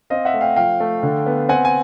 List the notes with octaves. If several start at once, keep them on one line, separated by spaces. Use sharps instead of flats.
C4 D#5 F5
E5 F#5
A3
F5 G5
F3 F5 G5
A3
D3
B3
C4 F#5 G#5
G#5